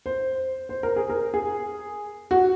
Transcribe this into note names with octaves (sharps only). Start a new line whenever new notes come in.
C5
C5
A#4
G#4
A#4
G#4
F#4